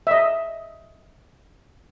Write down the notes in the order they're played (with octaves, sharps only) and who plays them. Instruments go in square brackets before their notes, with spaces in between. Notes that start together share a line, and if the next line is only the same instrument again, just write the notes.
[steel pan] D#5 E5